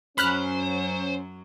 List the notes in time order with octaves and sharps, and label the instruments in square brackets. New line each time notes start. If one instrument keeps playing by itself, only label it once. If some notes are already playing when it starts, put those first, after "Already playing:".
[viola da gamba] F#2 F#3 [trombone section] C#4 [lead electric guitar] C5 [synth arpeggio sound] B5 F6 F#6